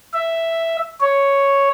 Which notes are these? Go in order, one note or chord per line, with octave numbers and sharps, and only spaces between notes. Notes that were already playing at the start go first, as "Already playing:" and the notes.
E5
C#5